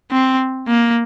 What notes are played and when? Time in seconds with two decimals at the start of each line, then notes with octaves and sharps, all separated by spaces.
0.12 C4
0.68 A#3